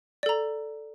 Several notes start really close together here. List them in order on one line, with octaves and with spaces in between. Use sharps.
D5 A4 A#5